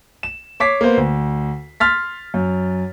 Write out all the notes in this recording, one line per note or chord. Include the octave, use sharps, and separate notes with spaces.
E7
C#5 D6 B6 C7
A#3 B3 C5
D2
C6 F6 A6 B6
F#2